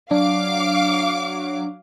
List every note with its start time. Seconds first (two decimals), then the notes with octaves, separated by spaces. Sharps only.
0.11 F#3 D4 F5 D6